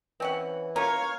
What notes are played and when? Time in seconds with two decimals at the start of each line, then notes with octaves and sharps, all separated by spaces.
0.20 E3 C4 C#4 F#5
0.76 A#3 C#4 F4 C#5 F5 A#5